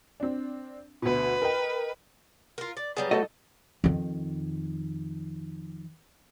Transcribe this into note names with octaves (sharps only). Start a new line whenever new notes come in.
C4 D4
D2 B2 B4
A#4 D#5 G5
F4 A#4
D5
F#3 G3 B3 G#4
A3 F#4 A4 D#5
F2 D#3